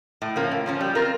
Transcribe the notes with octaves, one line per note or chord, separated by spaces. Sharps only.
A2
F3 A#3 C#4
A2
F3 A#3 C#4
G3
C4 F4 A#4